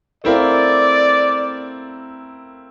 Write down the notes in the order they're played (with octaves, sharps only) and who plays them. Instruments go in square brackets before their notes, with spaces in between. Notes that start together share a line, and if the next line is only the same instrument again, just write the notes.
[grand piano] A3 C4 E4 A#4 F5 [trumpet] D5